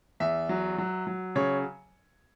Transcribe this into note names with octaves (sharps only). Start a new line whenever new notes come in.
E2 E5
F#3
F#3
F#3
C#3 C#5